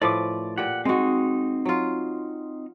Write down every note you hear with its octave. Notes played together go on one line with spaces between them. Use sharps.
A2 F3 B4 D5 D6
A#2 G4 F#5
G#3 C4 D#4 F#4
F#3 F4